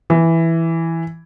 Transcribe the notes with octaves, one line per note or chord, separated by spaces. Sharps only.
E3